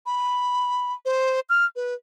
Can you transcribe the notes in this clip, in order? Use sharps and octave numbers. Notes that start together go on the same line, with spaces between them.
B5
C5
F6
B4